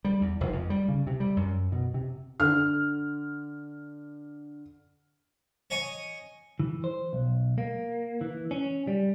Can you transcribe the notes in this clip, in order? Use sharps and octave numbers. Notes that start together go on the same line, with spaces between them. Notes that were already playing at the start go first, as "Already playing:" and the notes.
G3
E2
F1
F2
G3
C#3
C3
G3
F#2
B2
C3
D3 F6
C#5 D#5 G#5 C#6
E3
C5
B1
A#3
E3
C#4
G3